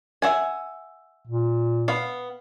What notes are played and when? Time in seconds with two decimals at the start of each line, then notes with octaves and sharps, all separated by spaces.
0.22 E5 F#5 G#5
1.27 A#2
1.88 B3 F5